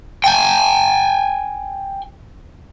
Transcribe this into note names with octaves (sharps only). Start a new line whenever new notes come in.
G5 G#5